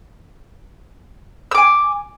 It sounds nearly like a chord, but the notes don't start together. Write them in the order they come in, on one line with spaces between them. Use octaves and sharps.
E6 D6 G#5